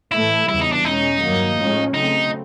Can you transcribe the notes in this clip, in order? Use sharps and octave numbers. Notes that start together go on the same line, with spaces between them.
A2 E3 A3 E4
E2 C#3 E3 G3 E4
D#4
D4
B2 G#3 C#4 D#4
G2 D#3 F#3 A#3
A2 F3 G#3 C#4
C#3 F#3 A3 C4 D#4